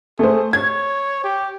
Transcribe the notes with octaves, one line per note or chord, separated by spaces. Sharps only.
A3 G#4 C5
C#5 G#6
G4